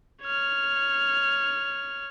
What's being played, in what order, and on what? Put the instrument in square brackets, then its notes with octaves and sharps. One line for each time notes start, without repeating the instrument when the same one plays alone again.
[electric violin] C#5 F6